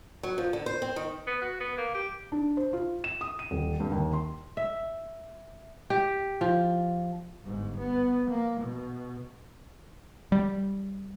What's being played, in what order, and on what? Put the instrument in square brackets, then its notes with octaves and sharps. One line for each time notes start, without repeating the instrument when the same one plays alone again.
[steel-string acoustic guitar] F#3
F3
D3
C5
C4
D#3
[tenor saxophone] B3
F#4
B3
A#3
G4
[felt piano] D4
C5
F4
E7
D#6
D#7
D#1
G2
D#2
C6
[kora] E5
G4
F3
[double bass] G1 G#2
B3
A#3
B2
[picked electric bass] G3